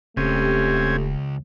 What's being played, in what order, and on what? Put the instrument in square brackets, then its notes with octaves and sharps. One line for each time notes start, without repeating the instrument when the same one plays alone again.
[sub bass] D#1 [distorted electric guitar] C#2 [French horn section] A3 G4 [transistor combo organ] C4 C#4 G#5